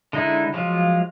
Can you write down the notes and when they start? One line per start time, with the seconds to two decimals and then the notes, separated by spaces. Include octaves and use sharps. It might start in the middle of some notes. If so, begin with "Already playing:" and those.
0.13 D3 G#3 D#4 E4
0.54 F3 F#3 G#3 F4